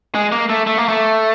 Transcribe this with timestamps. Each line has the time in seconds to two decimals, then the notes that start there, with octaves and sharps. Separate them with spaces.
0.15 G#3
0.32 A#3
0.50 A3
0.67 A3
0.78 A#3
0.88 A3